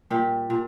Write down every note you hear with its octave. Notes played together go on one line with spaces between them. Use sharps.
A#2 G3 G4
A#2